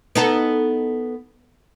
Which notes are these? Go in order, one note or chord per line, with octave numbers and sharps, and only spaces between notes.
B3 D#4 A4